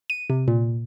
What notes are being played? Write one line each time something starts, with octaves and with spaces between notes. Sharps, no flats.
D#7
C3
A#2